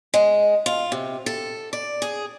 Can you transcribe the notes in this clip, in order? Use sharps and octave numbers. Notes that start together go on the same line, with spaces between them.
G#3
F4
C3
A4
D5
G#4